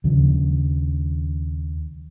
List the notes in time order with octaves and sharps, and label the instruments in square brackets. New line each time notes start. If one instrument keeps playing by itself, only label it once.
[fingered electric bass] D#2 C#3 F3